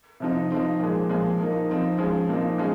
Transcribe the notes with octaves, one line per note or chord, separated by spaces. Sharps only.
C3 F3 C4 D#4
F3 C4 D#4
A#2 F3 G#3
A#2 F3 G#3
F3 A#3 D#4
F3 C4 D#4
F3 G#3 C#4
A#2 F3 C4 D#4
F3 G#3 C#4